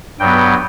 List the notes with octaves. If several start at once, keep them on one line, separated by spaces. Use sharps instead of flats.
G2 F#3 B3 G5